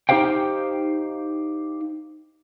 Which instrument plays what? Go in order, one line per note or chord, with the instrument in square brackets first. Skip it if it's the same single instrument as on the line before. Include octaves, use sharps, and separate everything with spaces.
[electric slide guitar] D#4 E4 G4 C5 F5 G5